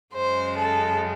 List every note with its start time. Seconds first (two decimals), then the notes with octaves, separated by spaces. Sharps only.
0.14 F#2 C#3 G#3 C5
0.57 A4